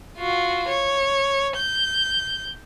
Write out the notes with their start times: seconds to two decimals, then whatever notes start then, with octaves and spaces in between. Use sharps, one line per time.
0.17 F4 F#4
0.68 C#5
1.57 G6